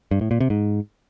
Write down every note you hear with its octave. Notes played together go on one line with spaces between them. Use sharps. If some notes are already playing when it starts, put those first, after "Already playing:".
G2
A2
A#2
C3
G#2